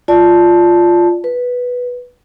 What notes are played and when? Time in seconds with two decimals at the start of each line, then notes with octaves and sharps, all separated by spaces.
0.08 F4 D5 A5
1.24 B4